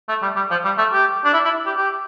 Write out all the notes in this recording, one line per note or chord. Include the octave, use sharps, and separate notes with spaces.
A3
G3
G3
F3
G3
A3
G4
D4
E4
E4
G4
G4